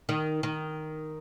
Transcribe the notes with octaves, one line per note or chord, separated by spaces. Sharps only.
D#3
D#3